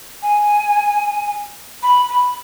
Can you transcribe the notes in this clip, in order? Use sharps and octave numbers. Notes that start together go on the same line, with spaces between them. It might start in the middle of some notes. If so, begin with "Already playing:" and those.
G#5
B5
B5